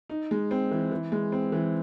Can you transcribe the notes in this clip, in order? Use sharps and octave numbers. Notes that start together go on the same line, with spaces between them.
D#4
G#3
C4
E3
E3
G#3
C4
E3